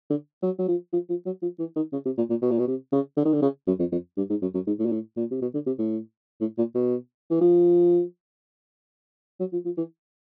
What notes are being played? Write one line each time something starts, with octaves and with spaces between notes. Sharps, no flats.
D3
F#3
F#3
F3
F3
F3
F#3
F3
E3
D#3
C#3
C3
A#2
A#2
B2
A#2
B2
C3
C#3
D3
D#3
D3
C#3
F#2
F2
F2
G2
G#2
F#2
F#2
G#2
A2
A#2
A2
A#2
C3
B2
D3
C3
A2
A2
A#2
B2
E3
F3
F#3
F3
F3
E3